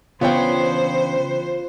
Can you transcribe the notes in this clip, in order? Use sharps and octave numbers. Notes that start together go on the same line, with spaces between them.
C#3 E3 B3 D4 F4 C5 C#5 G5